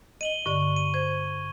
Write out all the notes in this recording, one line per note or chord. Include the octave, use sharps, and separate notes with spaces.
D#5 D#7 F#7 G7
G2 D3 D5 C#6
D#7
C5 G#6